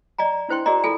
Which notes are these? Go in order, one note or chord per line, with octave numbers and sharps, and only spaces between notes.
D5 D#5 G#5 A#5
D4 E4 C5 G5 C6
F#4 G#4 A#4 D5 D#5 A#5
E4 F4 A4 G#5